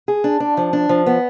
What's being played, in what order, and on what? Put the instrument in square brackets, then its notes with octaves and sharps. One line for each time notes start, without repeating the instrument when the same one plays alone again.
[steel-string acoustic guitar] G#4
D4
D4
F3
D4
F3
B3